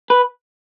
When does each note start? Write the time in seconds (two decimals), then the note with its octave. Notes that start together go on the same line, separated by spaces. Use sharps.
0.10 B4